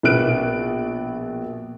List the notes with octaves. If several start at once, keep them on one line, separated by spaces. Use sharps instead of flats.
A#1 B2 A#3 B3 F#6 D7